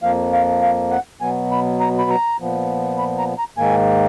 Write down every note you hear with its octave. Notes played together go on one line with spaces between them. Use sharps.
F2 F3 A#3 F5
F5
F5
F#5
B2 F#3 B3 G#5
B5
A#5
B5
A#5
A#2 F3 B3
B5
A#5
A#5
G#2 D#3 A#3 G#5